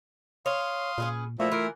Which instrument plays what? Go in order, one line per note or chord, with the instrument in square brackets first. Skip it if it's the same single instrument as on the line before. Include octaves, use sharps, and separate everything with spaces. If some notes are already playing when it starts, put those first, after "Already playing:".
[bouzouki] C#5 [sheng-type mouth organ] F5 C6 D#6
[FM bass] A#2 [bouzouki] C#4 G#4 B4
[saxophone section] A#2 F3 [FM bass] A3 [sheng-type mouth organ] E4 E5 [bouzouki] F#4
[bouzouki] E3 [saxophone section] F4 A#4